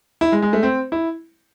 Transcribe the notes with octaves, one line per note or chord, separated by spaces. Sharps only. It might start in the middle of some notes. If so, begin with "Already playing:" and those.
E4
G#3
G#3
A3
C4
E4